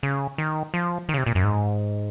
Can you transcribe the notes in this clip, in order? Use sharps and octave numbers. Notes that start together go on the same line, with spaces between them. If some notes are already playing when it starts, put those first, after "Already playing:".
C#3
D#3
F3
D#3
C#3
C3
A#2
F#2
G#2